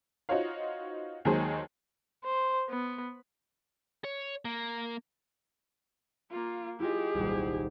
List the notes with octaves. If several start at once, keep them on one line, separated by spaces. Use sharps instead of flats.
D#4 F4 F#4 C5 C#5 F5
D#2 D#3 F#3 G#3 G#4 C5
C5
B3
C#5
A#3
A#3 F4
E4 F4 G4 G#4 D#5
D#1 C2